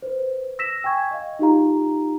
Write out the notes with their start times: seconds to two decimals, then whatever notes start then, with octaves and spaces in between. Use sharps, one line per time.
0.02 B4 C5
0.59 E6 A#6 B6 E7
0.84 G5 G#5 C#6 G#6
1.11 D#5 F5
1.39 D#4 F4 G4 F5 A#5